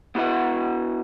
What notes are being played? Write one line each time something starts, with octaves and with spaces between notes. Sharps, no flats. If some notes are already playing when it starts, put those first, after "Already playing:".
B3 E4 F#4 B4 E5 F#5